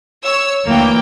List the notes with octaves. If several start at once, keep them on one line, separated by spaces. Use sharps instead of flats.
C#5 E6
D2 E3 A#3 G5